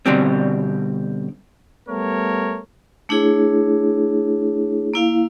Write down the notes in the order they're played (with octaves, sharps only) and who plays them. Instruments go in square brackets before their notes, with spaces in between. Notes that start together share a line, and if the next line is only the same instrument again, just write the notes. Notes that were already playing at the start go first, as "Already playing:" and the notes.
[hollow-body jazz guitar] B2 D3 G3 C4
[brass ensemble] G3 A3 B3 A#4 C#5
[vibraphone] A3 D4 E4 G#4 C#5
A#3 E4 F5